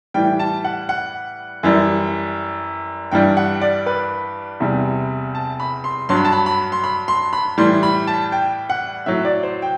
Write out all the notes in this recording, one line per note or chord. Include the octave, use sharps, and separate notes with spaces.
A2 E3 G3 G5
A5
F#5
F#5
F#2 E3 G3
G2 E3 G3 G5
F#5
D5
B4
E2 C3 G3
A5
B5
C6
G2 F#3 C6
B5
A5
B5
B5
C6
B5
C6
B5
A2 E3 G3 C6
B5
A5
G5
F#5
A2 F#3 E5
D5
C5
G5